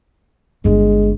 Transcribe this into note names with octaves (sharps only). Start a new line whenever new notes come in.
G1 G#3